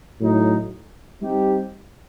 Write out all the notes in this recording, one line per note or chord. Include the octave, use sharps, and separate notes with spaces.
A2 F#3 A3 D#4
G3 C4 D#4 G4